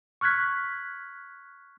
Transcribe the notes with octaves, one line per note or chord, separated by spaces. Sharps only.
C#6 F6 F#6 G#6 B6